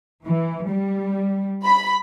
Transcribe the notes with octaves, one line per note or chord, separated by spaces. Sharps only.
E3
G3
B5